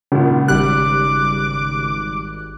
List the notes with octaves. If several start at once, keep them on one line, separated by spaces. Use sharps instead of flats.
G#1 A#2 C#3
G#1 G3 D6 F#6